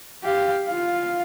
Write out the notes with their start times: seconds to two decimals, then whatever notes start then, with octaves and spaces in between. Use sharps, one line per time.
0.24 G4 F5
0.68 F4 F5